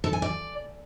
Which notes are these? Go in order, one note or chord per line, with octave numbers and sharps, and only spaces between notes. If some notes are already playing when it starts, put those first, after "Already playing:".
A4
G#5
D5